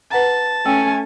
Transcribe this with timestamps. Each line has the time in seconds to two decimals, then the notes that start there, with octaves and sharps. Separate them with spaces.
0.12 B4 F#5 A5 A#5
0.66 A3 C#4 G5 G#5 E6